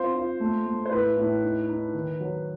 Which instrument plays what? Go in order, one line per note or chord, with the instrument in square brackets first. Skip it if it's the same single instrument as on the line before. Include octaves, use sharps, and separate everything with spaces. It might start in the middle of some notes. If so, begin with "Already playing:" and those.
Already playing: [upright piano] C4 F4 [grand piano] C5
[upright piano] F4
A3
A3
[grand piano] C5
[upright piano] A2 [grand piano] B4
[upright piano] A2
D#4
D#4
D#3
F#3